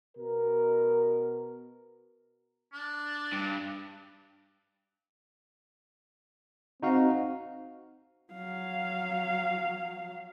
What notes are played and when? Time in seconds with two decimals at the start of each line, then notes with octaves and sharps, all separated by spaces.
0.17 B2 A#4
2.73 D4
3.33 G2
6.83 C4 D#4 F#4 F5
8.33 F#3 F5